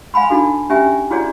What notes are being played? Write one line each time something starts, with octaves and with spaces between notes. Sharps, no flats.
F5 G#5 B5 C6
D4 D#4 F#4 A4
C#4 G4 E5 G#5
E4 F#4 G#4 C#5 D5